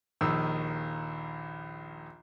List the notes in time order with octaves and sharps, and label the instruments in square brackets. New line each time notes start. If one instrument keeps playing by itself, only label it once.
[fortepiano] A#1 D#2 D#3 E6